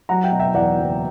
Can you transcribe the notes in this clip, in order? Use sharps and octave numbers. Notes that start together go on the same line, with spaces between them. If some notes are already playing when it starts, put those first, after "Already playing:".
F#3 F#5 A#5
E5 G5
B2
E5 G5
E2 D5 F#5
F#1